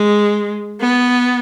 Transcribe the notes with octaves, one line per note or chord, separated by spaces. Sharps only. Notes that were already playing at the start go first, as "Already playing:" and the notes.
Already playing: G#3
B3